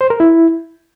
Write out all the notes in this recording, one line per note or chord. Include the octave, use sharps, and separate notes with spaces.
C5
A#4
E4